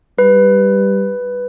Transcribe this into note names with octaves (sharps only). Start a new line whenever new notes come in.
G3 B4